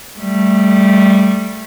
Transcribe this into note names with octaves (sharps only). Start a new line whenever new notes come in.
G3 A3